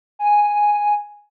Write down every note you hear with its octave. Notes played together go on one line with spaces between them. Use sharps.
G#5